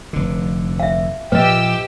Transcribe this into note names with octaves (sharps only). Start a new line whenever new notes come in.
F1 D3
E5 F5
A#2 F3 A#3 G4 B4 D#5 G5 E6